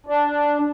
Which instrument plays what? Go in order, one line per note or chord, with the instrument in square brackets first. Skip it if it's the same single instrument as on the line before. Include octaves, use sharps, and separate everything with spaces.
[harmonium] D4